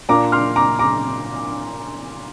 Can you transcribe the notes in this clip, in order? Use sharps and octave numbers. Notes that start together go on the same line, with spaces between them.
A#2 A#3 D4 F4 A#5 D6
C6 F6
A#5 D6
A#5 D6